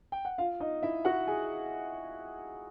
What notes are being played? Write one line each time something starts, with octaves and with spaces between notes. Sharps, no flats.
G5
F#5
F4 F5
D#4 D#5
E4 E5
F#4 F#5
G#4 G#5